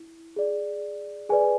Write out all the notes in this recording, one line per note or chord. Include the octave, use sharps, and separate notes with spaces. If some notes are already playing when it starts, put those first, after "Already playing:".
Already playing: E4
G#4 D5
G#4 B4 D5 G#5